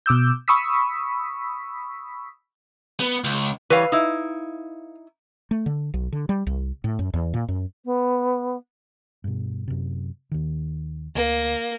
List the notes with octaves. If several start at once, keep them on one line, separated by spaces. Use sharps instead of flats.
B2 D6 E6 G6
B5 C#6 D#6 E6 B6
B3
C#2
E3 G3 B4 C#5 F5
D#4 E4
A3
D3
B1
D3
G3
C2
A2
F#2
E2
A#2
F#2
B3
G2 B2
F#2 C3
D#2 D#3
D2 D3 A#3